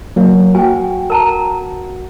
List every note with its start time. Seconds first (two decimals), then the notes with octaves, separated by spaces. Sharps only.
0.16 F#3 A#3
0.55 F#4 G5 G#5
1.10 A#4 A5 A#5